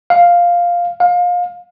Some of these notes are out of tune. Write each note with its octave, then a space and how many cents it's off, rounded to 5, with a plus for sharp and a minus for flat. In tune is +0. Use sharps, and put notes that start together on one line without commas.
F5 +0
F5 +25